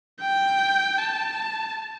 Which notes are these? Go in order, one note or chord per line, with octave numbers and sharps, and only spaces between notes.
G5
A5